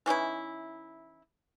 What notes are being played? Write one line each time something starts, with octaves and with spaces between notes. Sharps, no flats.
E3 C#4 D#4 E4